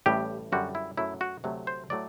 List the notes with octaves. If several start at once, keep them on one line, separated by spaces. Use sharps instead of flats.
A1 A2 G3 G4
F#2 D3 G3 F#4
E4
F#2 F#3 A3 E4
F#4
D2 C3 F#3 A3
C5
A2 F#3 A3 D5